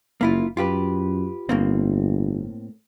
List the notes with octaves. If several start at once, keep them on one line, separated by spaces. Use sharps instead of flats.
F#1 A#3 E4 F4
F#2 F4 G4 B4
G1 A2 A#3 C4